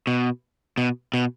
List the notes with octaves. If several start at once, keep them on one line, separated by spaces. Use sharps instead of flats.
B2
B2
B2